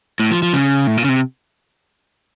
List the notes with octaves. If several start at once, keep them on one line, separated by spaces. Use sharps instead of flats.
A2
F3
F3
C#3
A2
A#2
C#3
C3